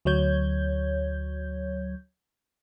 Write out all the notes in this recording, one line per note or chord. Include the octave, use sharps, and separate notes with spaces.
D2 F#3 C#5 G6 G#6